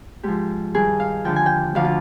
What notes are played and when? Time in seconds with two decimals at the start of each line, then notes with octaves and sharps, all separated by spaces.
0.23 G#2 F3 G4
0.74 G2 D#3 G#4
1.00 F5
1.25 D#2 D3 F3 G5
1.36 G#5
1.46 G5
1.75 D2 D3 F3 F5
1.85 F4